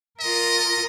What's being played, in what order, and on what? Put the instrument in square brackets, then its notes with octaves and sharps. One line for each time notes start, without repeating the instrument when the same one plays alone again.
[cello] F4 A#4 [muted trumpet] D#5